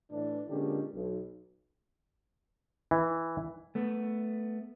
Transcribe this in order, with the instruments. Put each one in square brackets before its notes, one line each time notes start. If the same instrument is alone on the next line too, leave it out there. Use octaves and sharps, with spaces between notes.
[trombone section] A2 E3 D4
A#2 D3 G#3 C#4 D4 G4
B1
[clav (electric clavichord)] E3
[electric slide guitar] A3 B3